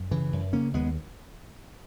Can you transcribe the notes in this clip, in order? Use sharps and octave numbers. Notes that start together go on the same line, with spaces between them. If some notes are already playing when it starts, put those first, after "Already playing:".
Already playing: F#2
C#3 E3
F#2
C#3 A#3 C#4
D#2 G#3 B3